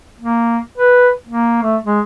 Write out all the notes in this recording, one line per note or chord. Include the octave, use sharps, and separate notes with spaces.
A#3
B4
A#3
A3
G#3